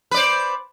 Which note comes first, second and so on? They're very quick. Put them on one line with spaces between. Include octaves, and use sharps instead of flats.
B4 D5 C5